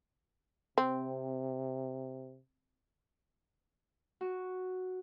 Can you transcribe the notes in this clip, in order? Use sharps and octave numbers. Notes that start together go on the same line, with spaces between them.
C3 C4
F#4